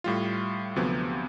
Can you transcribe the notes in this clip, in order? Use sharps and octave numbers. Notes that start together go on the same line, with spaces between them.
A2 G3 F4
D2 C3 F3 F#3 B3